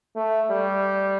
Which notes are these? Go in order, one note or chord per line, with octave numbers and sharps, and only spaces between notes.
A3
G3